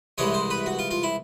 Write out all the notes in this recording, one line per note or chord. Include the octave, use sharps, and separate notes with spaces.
C2 C3 E3 G#3 C#5
C5
B4
F#4
F4
F4
E4